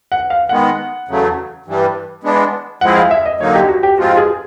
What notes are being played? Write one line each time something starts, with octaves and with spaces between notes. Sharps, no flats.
F#5
F5
D#3 G#3 B3 F#5
E2 C#3 F#3 A3
G2 E3 G3
E3 G#3 B3 D4
F3 G#3 C4 E4 G#4 F#5
F5
E5
D#5
D3 F#3 A#3 D#4 C#5
G4
F#4
G4
G#2 F3 G#3 C4 F4 F#4
G#4